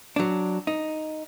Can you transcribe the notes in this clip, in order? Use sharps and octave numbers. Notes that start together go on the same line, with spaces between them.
F#3 D4
D#4